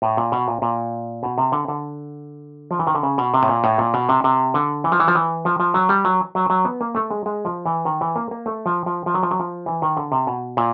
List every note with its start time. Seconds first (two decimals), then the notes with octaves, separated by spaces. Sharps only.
0.02 A2
0.17 A#2
0.32 B2
0.48 A#2
0.62 A#2
1.23 B2
1.38 C3
1.52 D3
1.68 D3
2.71 F3
2.79 E3
2.87 D#3
2.95 D3
3.03 C#3
3.18 B2
3.34 C3
3.43 A2
3.49 A#2
3.64 A2
3.78 A#2
3.94 B2
4.09 C3
4.24 C3
4.54 D3
4.84 E3
4.92 F3
5.00 E3
5.08 F3
5.15 E3
5.45 F3
5.60 F3
5.74 F#3
5.89 G3
6.05 F#3
6.35 F#3
6.50 F#3
6.65 B3
6.81 A#3
6.95 A3
7.10 G#3
7.26 G#3
7.45 F3
7.66 E3
7.85 D#3
8.01 E3
8.16 A#3
8.31 A#3
8.46 A3
8.66 F3
8.86 F3
9.06 F3
9.14 F#3
9.23 F3
9.31 F#3
9.40 F3
9.66 E3
9.82 D#3
9.97 D3
10.12 C3
10.27 B2
10.57 A#2